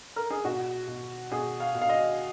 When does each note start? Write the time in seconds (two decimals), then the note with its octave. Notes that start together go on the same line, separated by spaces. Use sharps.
0.16 A#4
0.30 G#4
0.44 B2 F#4
0.87 B2
1.31 B2 G#4
1.60 F5
1.75 B2
1.81 F5
1.89 D#5